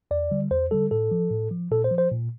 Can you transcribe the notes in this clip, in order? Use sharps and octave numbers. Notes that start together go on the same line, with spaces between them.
E2 D5
D3 G3
E2 C5
D3 G3 A4
A2 A4
F3
A2
F3
A#2 A4
C5
F3
C5
A#2